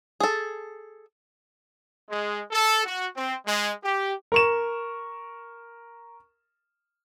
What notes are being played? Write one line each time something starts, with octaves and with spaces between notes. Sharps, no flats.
G#4 A4
G#3
A4
F#4
C4
G#3
G4
A#4 C#6 E7